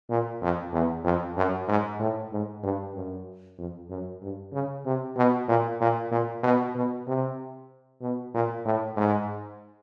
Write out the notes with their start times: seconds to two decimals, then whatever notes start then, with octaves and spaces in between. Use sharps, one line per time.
0.10 A#2
0.42 F2
0.73 E2
1.04 F2
1.37 F#2
1.68 G#2
1.99 A2
2.32 G#2
2.64 G2
2.95 F#2
3.58 F2
3.90 F#2
4.22 G2
4.53 C#3
4.86 C3
5.16 B2
5.49 A#2
5.81 A#2
6.11 A#2
6.43 B2
6.75 B2
7.07 C3
8.02 B2
8.34 A#2
8.65 A2
8.97 G#2